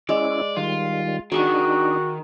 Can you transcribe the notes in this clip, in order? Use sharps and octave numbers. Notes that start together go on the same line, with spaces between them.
G#3 C#4 E4 D5
D#3 G3 F4
D#3 D4 D#4 F#4 G#4 E5 F#5